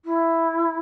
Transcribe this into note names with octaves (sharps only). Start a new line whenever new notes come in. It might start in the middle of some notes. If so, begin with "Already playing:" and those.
E4